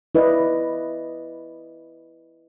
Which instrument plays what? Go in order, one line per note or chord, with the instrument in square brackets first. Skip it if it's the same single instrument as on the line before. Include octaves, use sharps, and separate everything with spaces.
[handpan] E4 B4 D5 D#5